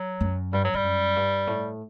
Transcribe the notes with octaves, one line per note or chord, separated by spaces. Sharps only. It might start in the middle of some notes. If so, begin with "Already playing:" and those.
Already playing: F#3
F#2
G2 G3
F#3
G2 G3
F#2
G2
A2